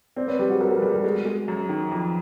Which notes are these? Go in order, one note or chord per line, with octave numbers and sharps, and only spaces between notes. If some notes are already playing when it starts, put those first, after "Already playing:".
C4 C5 D5
B4 C#5
G3 G4
F#4 G#4
B1 G#4 A#4
A4 B4
G3 G#4 A#4
G4 A4
G#3 F#4 G#4
G#3
F#2
D#3
F2